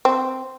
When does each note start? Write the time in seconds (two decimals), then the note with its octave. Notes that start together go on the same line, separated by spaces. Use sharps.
0.05 C4